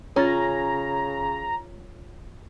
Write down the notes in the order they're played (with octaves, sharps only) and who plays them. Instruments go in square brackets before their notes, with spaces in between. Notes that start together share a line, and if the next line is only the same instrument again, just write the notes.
[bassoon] C#3 [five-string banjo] C#4 [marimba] F4 A6 [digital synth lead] A#5